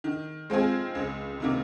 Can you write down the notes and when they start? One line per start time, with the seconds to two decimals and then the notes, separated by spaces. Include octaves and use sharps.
0.04 D#3
0.50 G#3 C4 F4 G#4
0.95 C#2
1.40 C3 D#3 A#3